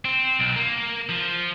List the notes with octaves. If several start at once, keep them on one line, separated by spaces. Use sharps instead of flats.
C4
B1
A#3
F3